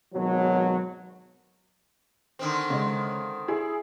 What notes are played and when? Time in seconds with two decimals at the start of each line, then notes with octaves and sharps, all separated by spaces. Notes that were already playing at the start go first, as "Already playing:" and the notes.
0.14 G#1 B2 F#3
2.39 D3 D#3 C4
2.70 C#3 G#3
3.48 E4 G#4